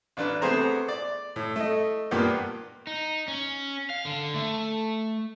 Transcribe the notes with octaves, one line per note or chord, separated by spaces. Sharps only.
A1 D4 B4
C3 A3 B3 G#4 C5 A#5
D5
A2
A3 D#5
G2 A#2 A#3 B3 G4
D#4
C#4
F5
D3
A3